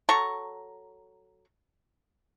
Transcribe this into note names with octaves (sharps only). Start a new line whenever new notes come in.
F#3 A4 A#5 C#6